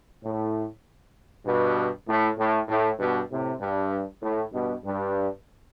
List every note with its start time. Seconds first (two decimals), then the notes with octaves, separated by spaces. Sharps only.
0.24 A2
1.46 G2 B2
2.08 A2
2.38 A2
2.68 A2
3.00 G2 B2
3.30 A2 C3
3.60 G2
4.22 A2
4.52 G2 B2
4.84 G2